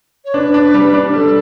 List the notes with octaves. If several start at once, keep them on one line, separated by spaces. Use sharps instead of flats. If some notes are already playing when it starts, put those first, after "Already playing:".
C#5
D4 B4
D4
G3
D4
G3 A4